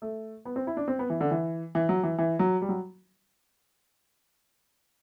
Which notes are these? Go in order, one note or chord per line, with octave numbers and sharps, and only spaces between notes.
A3
B3
C4
E4
D4
C4
B3
E3
D3
E3
E3
F#3
E3
E3
F#3
G3
F#3